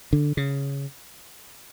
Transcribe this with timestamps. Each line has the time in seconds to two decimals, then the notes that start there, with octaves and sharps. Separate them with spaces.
0.13 D3
0.37 C#3